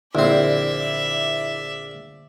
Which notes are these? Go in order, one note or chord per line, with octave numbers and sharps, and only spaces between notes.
A#1 D3 C4 E4 D5 E5